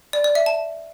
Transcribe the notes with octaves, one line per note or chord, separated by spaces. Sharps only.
D5
D5
E5
A5